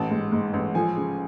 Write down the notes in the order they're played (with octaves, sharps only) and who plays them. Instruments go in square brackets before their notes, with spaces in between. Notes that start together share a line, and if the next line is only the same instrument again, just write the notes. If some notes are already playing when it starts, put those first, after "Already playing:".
Already playing: [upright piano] A1 A5
G#2
G#2
A1
F3 G#5
C#3